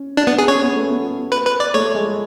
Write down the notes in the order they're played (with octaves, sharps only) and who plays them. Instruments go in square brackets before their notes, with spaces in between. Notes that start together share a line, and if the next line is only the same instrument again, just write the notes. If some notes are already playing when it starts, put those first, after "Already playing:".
Already playing: [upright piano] C#4
[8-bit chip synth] D4
B3
G#4
[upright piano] C#4 [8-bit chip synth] C#5
[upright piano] B3
A3
B3
[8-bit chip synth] B4
B4
D5
[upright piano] A3 [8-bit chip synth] C#5
[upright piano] G#3